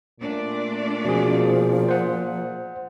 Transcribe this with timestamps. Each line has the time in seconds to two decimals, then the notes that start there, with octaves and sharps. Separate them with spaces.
0.20 A#2 A3 D4 D5
1.05 B2 F3 G#4
1.88 C5 F#5